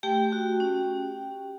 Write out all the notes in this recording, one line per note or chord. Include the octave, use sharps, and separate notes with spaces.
A3 G4 G5
F#4
C#4